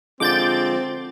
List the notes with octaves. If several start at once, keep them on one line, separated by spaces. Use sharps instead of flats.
D3 F3 G#3 C4 D6 G6 A6